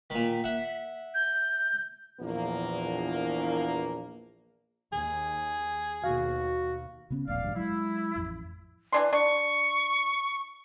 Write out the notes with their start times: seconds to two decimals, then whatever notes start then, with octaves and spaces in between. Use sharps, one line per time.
0.10 A#2 D#3 B6
0.44 E5 F#5
1.14 G6
2.21 A#1 E2 A#3
4.92 D#2 G#4
6.04 D#2 B2 F#4 F5
7.10 C#3 B3 C#4
7.28 D#1 A#1 A3 D5 F5
7.42 A1 D2 G2
7.56 F#3 G#3 E4
8.16 A1 F2
8.92 E3 D4 C6
9.13 D4 C#6